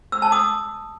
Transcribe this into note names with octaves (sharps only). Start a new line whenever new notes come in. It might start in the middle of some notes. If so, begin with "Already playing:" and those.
E6
A5
D#6